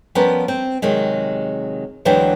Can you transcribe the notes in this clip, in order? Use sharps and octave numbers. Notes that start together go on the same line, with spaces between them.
F3 G3 B3 C#4 A#4 B4
C4
C3 D#3 F#3 G#3
D2 E3 F#3 G#3 D4 G5